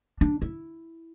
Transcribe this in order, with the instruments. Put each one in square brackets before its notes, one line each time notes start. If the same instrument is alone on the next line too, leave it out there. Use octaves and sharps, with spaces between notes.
[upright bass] D4
E4